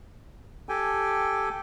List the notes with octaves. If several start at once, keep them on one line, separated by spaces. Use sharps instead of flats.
G4 A4 G5 G#5